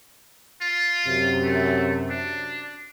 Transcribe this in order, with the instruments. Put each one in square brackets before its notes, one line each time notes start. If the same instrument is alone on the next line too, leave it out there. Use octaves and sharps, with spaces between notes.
[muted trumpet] F4
[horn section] F#2 C3
[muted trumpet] A3
D4